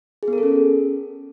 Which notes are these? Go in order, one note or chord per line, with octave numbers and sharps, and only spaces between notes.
G#4
B3
A#4
A4
C#4